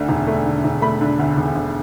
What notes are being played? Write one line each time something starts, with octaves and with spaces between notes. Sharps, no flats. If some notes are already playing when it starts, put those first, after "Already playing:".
Already playing: D2 D3 A3
E1
A3
D3
E1
A3 B5
D3
D2
E1
D2